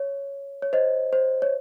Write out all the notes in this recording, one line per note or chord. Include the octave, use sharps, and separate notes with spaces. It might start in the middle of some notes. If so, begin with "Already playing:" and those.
Already playing: C#5
C#5
C5 D#5
C5
C#5